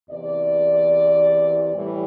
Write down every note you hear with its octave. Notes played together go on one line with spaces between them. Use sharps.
E2 C3 E3 D5
A2 E3 G3